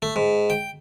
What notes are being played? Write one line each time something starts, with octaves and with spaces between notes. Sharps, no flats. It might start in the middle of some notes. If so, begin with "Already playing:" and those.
A3
G#2
G5